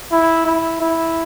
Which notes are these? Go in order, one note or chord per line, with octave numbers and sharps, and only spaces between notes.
E4
E4
E4